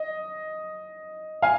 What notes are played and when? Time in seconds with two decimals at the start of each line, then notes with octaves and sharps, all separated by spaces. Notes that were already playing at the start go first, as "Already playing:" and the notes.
Already playing: D#5
1.42 F5 G#5